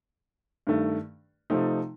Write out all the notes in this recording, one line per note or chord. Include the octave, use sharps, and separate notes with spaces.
G2 D#3 A3
C3 F3 A3 D#4